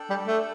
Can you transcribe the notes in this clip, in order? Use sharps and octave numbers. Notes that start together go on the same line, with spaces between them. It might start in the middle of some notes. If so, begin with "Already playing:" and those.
Already playing: D4 A4 D5 G5
G3
A3